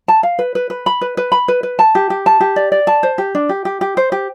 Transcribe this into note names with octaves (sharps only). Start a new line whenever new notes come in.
A5
F5
B4
B4
B4
B5
B4
B4
B5
B4
B4
A5
G4
G4
A5
G4
D5
D5
A5
C5
G4
D4
G4
G4
G4
C5
G4